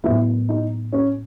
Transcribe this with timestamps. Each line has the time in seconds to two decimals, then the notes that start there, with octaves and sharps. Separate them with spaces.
0.04 A2 F#3 B3 E4
0.49 D#4
0.93 C#4